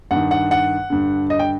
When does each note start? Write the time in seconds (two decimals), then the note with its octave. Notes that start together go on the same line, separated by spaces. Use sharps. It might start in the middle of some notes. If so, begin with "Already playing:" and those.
0.11 G2 D#3 F#5
0.31 F#5
0.51 F#5
0.90 G2 D3
1.30 D#5
1.39 G5